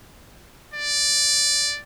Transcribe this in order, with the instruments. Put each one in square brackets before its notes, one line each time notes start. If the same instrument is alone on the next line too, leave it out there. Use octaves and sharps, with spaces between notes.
[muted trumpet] D5